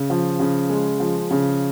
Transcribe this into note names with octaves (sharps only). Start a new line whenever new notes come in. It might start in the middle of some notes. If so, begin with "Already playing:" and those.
Already playing: C#3
F3
C#3
G#3
F3
C#3